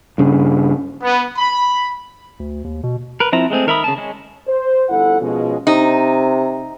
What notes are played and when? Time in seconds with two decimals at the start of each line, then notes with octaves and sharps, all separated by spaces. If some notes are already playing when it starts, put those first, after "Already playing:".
0.18 G2 C#3
1.03 B3
1.37 B5
2.40 D2
2.64 D#2
2.83 B2
3.20 A#4 B4
3.32 F3 C4 E4 A#5
3.50 G#3 A3 C4 G#4
3.67 D#3 A#4 E5 B5 D#6
3.84 C#3 A5
3.98 G#3 C#4
4.47 C5
4.89 G1 F2 E4 A4 F#5
5.20 B2 F3 G#3 C#4
5.67 C3 D#4